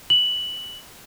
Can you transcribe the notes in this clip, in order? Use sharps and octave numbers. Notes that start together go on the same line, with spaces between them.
F#7